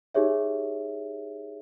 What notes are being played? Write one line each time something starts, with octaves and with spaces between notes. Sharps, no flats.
D#4 G4 G#4 C#5 E5